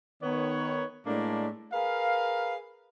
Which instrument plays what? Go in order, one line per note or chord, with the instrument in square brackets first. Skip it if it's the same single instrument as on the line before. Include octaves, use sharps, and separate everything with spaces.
[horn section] D#3 B3 C#5
A2 G#3 A#3 D4 A4 D5
G#4 A#4 B4 F5